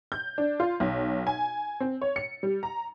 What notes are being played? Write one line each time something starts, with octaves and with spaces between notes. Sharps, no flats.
G6
D4
F4
B1
G#5
C4
C#5
C#7
G3
A#5